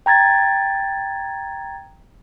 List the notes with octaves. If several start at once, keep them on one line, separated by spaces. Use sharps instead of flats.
G5 A#5 G#6 A6